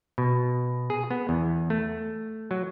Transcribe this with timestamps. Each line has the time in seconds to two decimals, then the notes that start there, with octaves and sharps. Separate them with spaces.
0.18 B2
0.90 G#4
1.11 B3
1.29 E2
1.70 A3
2.51 F#3